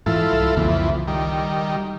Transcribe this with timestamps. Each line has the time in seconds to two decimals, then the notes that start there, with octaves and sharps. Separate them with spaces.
0.06 G#2 E3 E4 F4 A4
0.33 C2
0.57 C2 F2 C#3 E3 A#3
1.08 D#3 G3